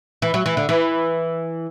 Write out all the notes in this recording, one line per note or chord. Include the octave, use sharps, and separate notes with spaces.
E3
F#3
E3
D3
E3